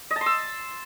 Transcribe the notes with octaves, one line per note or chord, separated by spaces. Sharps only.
D#5
A5
C6
E6